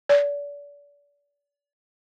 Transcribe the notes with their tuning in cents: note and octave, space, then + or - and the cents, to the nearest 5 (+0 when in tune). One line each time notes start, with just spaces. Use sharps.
D5 -35